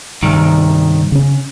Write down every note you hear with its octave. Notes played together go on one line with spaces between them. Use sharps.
C2 G2 D#3
C#3 C#4